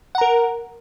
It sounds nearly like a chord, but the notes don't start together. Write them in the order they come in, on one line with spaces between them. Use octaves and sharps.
F#5 A#5 A#4